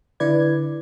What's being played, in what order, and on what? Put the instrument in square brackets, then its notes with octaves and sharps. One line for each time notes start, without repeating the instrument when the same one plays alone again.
[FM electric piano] D3 E4 B4 D5 G#6